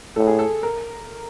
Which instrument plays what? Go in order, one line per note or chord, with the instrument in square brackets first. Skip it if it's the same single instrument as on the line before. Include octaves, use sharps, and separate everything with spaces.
[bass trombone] A2 [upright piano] A4
[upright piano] G#4
A4
A#4